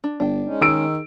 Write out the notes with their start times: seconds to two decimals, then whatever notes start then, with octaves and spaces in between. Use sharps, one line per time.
0.04 D4
0.20 G1 D4 G5
0.45 G#3 C#4 D#4
0.61 D#3 G#4 E6 D7